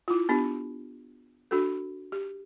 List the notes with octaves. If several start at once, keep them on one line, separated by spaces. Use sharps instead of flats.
E4 F4
B3 D4 G4
D4 F#4 A4
G4